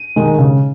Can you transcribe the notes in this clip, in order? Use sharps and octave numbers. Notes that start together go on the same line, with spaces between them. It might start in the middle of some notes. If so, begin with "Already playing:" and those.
Already playing: D#7
D#3 G#3 D#4
C#3